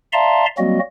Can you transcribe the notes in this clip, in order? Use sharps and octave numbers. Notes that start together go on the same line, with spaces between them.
D5 E5 F5 A5 A#5 C6
F#3 G3 A#3 C4 F#4 D#5